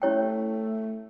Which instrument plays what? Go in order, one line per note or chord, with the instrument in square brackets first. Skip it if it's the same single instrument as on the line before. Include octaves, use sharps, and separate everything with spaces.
[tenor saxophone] A3 [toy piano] C#4 E4 G4 C#5 G5